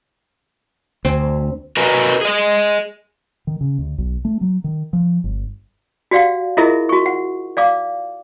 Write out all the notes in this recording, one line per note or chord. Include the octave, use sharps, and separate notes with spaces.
D2 C4 G#5
F#4 A#4 B4 D#5 G#5 A#5
G#4 D#5
D#3
C#3
D2
B1
A3
F#3
D#3
F3
G1
F#4 G4 D5 F5 F#5
E4 F4 G#4 A#4 D#5 E5
F#4 C#6
F#5
D5 F5 D6